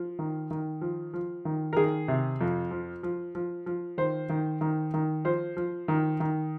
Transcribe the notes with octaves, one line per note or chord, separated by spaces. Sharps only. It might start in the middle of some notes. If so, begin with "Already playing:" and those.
Already playing: F3
D#3
D#3
F3
F3
D#3
A#4
D#3 G#4
C3
F2
F3
F3
F3
F3
D#3 C5
D#3
D#3
D#3
F3 C5
F3
D#3
D#3